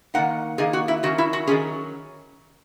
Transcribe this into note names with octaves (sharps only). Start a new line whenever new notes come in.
D#3 A#3 D#4 F#5
D#3 A#3 D#4 G#4
F#4
E4
D#3 F#3 C#4 F#4
E4
F#4
D#3 F#3 C#4 G#4